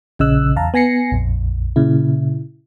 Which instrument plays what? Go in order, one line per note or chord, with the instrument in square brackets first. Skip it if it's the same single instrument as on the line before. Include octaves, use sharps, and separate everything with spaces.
[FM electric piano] A#1 C#3 D#5 E6 F#6
E2 F5 A5 A#5
B3 G#5 A#6 C7 C#7
A#1 F2
A#2 C#3 E4